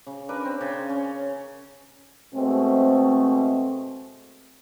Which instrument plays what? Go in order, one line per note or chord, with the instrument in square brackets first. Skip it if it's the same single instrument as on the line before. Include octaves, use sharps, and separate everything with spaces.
[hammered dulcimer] C#3
D4 A#4 B4
C4
C#3
C#4
[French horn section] B2 G#3 A3 C4